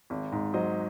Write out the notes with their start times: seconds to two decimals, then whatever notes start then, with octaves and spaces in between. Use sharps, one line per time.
0.10 G#1
0.32 G#2
0.54 F#3 C5 D#5